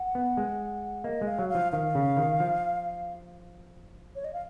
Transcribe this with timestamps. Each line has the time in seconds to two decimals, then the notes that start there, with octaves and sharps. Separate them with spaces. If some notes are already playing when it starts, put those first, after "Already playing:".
Already playing: F#5
0.15 B3
0.37 G#3
1.04 A#3 D#5
1.21 G#3
1.27 F5
1.39 F#3
1.50 F5
1.55 F3
1.72 D#3 F5
1.95 C#3
2.17 D#3
2.40 F3
4.16 C#5
4.24 D#5
4.33 F5